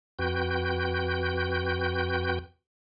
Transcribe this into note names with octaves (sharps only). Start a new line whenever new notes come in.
F2 F#4 B4 G5 G6